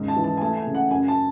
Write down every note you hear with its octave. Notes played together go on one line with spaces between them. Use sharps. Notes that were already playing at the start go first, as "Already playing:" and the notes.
Already playing: D#2 G#2 C#3
A5
E3
A5
G#5
A3 A5
G#5
C#3
F#5
F#2 G#5
A5